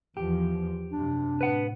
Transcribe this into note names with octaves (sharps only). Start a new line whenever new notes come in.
E2 F3 G4
F#2 C3 D4
A2 B4 F#5